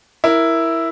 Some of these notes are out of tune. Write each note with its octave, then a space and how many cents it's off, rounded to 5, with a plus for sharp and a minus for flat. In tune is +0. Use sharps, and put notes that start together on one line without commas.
E4 +0 A#4 +0